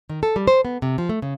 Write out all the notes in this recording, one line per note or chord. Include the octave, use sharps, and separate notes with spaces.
D#3
A4
G3
C5
B3
C3
F3
A3
C#3